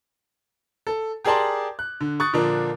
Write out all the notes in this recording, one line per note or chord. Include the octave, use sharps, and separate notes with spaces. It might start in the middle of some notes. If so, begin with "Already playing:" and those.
A4
G4 G#4 A#4 D5 A5 C6
F#6
D3
C#6 D#6 F#6 A6
A#2 D3 F3 A#3 D4